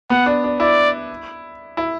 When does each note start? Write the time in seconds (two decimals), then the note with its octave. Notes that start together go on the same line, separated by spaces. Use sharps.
0.10 B3 F#5
0.26 D4
0.44 D4
0.60 E4 D5
1.77 E4